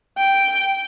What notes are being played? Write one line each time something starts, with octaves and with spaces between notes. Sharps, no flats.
G5